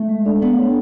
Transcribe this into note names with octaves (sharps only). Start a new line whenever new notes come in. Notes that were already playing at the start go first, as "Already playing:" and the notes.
Already playing: A3
G#3
D4 A4 D5
A3 B3
D4 A4 C#5